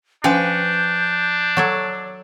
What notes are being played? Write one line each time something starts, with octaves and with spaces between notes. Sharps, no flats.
F3 C#4 D4 B4 G5 G6
F#3 A4 C#5